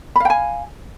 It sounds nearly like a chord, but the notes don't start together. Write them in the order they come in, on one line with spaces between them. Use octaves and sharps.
B5 F5 G5 G#5